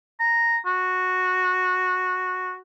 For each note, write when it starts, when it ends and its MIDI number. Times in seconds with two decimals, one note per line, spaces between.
0.20 0.58 82
0.66 2.57 66